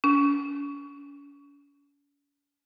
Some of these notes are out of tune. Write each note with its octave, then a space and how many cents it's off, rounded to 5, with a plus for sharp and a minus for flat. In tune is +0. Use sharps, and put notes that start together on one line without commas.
C#4 +45